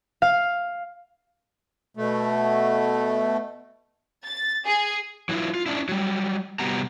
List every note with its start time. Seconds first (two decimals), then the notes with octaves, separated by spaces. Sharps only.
0.22 F5
1.97 B2 A3
4.26 A6
4.67 G#4
5.29 E3 F#3 G3 E4 F4
5.54 F4
5.66 C#4 D4 E4
5.89 F#3 G3
6.59 C3 G3 B3 F#4 G4 A#5